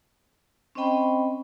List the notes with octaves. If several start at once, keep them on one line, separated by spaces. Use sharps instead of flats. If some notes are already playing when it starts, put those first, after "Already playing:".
C4 C#4 C5 D#5 G5 B5